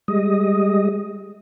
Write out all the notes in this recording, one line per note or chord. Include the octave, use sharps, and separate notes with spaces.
G3 G#3 D#5